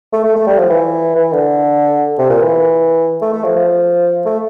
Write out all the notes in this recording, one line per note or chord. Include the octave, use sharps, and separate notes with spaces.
A3
A3
A3
G3
F3
E3
E3
D3
C3
A#2
E3
A3
A3
F3
F3
A3